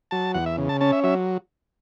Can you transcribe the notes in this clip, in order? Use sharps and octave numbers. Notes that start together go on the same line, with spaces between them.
F#3 A5
E2 F#5
E5
C#3
A5
C#4 A5
E5
F#3 E5